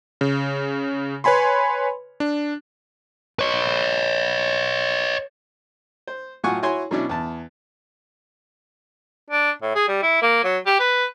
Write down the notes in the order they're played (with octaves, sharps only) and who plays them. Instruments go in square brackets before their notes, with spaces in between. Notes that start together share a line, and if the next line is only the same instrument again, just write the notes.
[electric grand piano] C#3
B4 C#5 G#5 B5 C6
D4
[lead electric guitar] B4 C#5
[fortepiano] C5
A2 F#3 F4 F#5 G#5 C#6
E4 F#4 C#5 G#5 C6
B2 F#3 C#4 D4 E4
E2 A5
[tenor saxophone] D4
A2
G#4
G3
E4
A#3
F#3
G4
B4